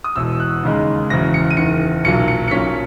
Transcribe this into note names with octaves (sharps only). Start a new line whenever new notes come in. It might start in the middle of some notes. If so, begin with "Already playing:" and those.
D#6
E1 E2 B2 E6
F#6
D#2 C#3 G#3 D#4
F#1 E2 C#3 F#3 A#6
C#7
D#7
F#1 E2 D#3 C#7
B1 A#2 F#3 C#7
C#7
C#7
B1 A#2 F#3 C#4 B6